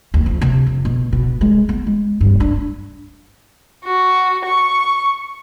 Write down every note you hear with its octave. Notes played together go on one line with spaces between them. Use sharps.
D#2
F2
C3
F2
B2
B2
G#3
B3
G#3
G2
D4
F#4
C#6